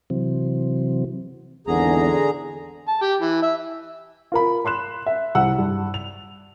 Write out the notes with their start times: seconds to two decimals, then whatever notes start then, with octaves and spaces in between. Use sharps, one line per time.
0.10 C3 E3 F#3 C4
1.67 G#1 E2 D3 G#4 A#5
2.88 A5
3.02 G4
3.20 E3
3.43 E5
4.32 F4 A#4 B5
4.65 B5 C6 F#6 E7
5.06 E5
5.35 C2 F#5 E6
5.59 G2
5.94 F7